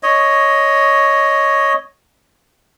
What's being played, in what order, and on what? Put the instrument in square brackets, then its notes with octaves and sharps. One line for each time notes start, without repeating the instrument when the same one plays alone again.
[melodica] C#5 D#5